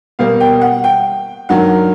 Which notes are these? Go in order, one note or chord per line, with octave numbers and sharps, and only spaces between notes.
B2 G3 A#3 F5
G5
F#5
G5
G2 D#3 F#3 A#3 F#5